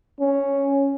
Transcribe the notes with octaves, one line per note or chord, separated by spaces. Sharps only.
C#4